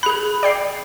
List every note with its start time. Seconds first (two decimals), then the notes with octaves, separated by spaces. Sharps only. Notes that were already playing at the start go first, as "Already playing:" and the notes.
0.03 G#4 B5 F#6
0.43 D5 G5 C7